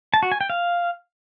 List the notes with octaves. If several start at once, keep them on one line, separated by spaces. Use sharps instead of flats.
A5
F#4
G#5
G5
F5